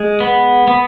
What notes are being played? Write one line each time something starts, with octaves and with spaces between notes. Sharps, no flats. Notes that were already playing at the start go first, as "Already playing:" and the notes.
Already playing: G#3
B3
B3